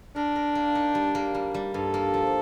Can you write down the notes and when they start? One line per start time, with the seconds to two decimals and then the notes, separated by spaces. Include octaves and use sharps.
0.15 D4 A#4
0.36 A#4
0.55 A#3
0.75 D#4
0.95 G3
1.15 A#3
1.34 G3
1.54 G3
1.74 G2 A4
1.94 A#3
2.14 F3